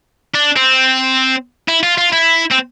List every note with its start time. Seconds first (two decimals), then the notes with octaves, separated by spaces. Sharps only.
0.35 D4
0.56 C4
1.68 E4
1.83 F4
1.98 F4
2.13 E4
2.52 C4